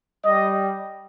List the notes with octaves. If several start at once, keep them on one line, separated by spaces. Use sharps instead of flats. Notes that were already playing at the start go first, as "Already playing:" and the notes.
G3 D#5